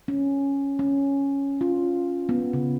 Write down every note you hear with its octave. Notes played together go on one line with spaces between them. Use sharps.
C#4
C#4
F4
B3
C#3